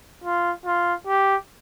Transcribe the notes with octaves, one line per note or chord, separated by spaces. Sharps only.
F4
F4
G4